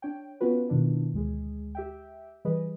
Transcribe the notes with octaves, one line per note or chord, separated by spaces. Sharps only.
D4 C#5 G5
B3 C#4 F4 F#4 B4
B2 D#3 D4 E4
D2 G#3 G#4
G4 E5 G5
E3 G3 G#4 B4 D#5